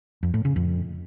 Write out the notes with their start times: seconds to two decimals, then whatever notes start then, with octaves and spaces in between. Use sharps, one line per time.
0.23 F2
0.34 A2
0.45 C#3
0.56 F2